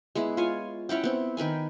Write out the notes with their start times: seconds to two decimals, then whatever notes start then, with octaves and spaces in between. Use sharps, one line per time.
0.15 G#3 B3 E4
0.37 F4 C#5 G#5
0.89 C#4 E4 F#5 G5
1.04 B3 C4
1.37 D#3 B4 G5 G#5